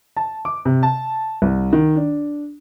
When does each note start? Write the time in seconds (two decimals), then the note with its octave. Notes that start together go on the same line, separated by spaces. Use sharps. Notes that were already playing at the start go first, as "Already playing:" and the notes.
0.17 A5
0.45 D6
0.65 C3
0.83 A5
1.42 C2
1.73 D#3
1.96 D4